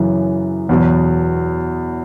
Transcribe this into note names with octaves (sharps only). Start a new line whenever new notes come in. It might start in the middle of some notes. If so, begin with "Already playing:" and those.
Already playing: F#2 C#3 E3
E2 B2 F#3